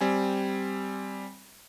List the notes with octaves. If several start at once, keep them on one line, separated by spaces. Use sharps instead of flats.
G3 C4 G#5